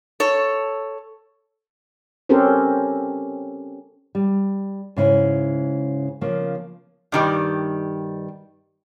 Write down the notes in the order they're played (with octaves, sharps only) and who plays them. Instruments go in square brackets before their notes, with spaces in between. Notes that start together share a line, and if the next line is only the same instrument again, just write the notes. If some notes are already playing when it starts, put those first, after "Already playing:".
[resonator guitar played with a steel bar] A4 C#5
[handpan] C4 C#4 G4 A4 A#4 C5
[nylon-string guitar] G3
G#2 C#3 E4
C#3 F3 A#3
[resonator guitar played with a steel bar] G2 D#3 G3